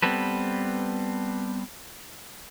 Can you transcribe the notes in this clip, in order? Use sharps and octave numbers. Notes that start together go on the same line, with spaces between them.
G3 B3 C4 A4 B4